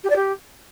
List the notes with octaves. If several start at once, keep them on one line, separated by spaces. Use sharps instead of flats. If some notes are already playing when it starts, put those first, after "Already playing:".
G4
D5
G4